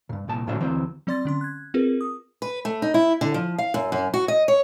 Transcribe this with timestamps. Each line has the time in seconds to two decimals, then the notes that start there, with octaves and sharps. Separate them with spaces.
0.09 G2 A#2
0.28 C2 A#2 A5
0.47 A2 D3 F#3 D4 C5 E5
0.60 D2 E3 F#3 C4 C5
1.07 F#3 C4 D5 C6 A6
1.25 D3 C#4 C6
1.41 F#6 G#6
1.74 C4 F4 G#4 A#4 B4
2.01 D#6
2.42 B4
2.65 A3
2.82 D#4
2.94 E4
3.21 D3
3.34 F3
3.58 F5
3.74 F#2
3.92 F#2
4.14 F#4
4.28 D#5
4.48 C#5